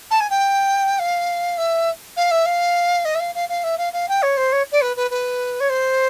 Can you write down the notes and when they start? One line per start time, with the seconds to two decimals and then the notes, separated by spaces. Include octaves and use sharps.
0.11 A5
0.21 G#5
0.30 G5
0.99 F5
1.58 E5
2.17 F5
2.31 E5
2.46 F5
3.05 D#5
3.15 E5
3.20 F5
3.35 F5
3.49 F5
3.64 E5
3.78 F5
3.93 F5
4.09 G5
4.22 C#5
4.37 C5
4.52 C#5
4.72 D5
4.81 B4
4.97 B4
5.11 B4
5.60 C#5
5.70 C5